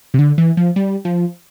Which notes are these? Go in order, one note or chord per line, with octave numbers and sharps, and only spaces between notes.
C3
D3
E3
F3
G3
F3